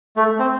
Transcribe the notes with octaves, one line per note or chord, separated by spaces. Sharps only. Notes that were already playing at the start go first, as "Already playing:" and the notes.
A3
C4